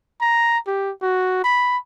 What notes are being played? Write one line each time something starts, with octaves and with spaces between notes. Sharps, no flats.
A#5
G4
F#4
B5